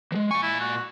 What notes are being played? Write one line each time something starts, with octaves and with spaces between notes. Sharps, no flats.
E3 G#3
A#2 G#5 C#6
E4
F#4